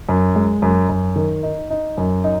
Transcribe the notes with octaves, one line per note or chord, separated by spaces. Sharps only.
F#2
G#3
F#2
F#2
D#3
D#4
D#4
F#2
D#4